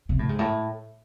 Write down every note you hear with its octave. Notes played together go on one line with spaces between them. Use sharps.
C3
A2
G#2
A2